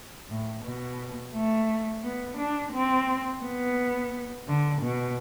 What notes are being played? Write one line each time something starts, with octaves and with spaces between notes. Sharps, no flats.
A2
B2
A3
B3
D4
C4
B3
D3
B2